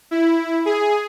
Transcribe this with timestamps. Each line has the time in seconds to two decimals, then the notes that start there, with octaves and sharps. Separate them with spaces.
0.11 E4
0.65 G#4